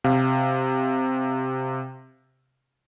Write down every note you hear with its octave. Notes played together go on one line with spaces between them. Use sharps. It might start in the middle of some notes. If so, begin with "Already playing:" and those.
C3 F5